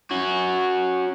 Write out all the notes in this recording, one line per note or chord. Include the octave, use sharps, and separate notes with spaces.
C#4 F#4